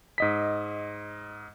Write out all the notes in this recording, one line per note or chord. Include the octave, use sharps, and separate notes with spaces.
G#2 D#5 B6